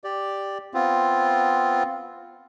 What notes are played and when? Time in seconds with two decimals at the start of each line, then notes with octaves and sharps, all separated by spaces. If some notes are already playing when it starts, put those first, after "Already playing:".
0.04 G4 D5
0.74 B3 C4 F4